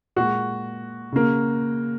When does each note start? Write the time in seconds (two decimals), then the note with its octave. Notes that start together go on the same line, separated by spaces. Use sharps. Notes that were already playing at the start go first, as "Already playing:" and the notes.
0.16 A#2 G#3 F#4
1.12 C#3 A#3